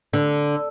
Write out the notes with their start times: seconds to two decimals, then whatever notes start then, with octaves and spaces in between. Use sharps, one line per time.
0.13 D3